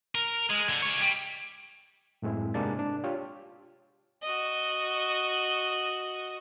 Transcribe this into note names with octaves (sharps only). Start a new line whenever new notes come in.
A#4
G#3
D3
G#3 C#5
G3
F#2 A2 G#3 C4 E4
G#2 C3 G#3 A#3 D4 A6
D4
F4 G4 C#5
F#4 D#5